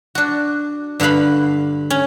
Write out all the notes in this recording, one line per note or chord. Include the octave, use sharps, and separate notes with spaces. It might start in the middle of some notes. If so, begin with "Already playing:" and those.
D4 F#4
G2 D3 F#4 F5 B5
C#4